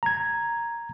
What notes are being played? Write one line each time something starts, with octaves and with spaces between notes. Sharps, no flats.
A#5 G#6